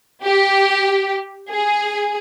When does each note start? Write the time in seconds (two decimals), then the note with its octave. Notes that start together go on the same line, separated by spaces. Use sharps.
0.24 G4
1.50 G#4